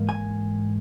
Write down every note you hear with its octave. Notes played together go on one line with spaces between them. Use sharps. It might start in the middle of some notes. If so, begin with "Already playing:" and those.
Already playing: G#2 E3 A#3
G#5